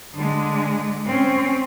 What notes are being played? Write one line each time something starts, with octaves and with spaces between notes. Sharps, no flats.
D3 G#3
C4 C#4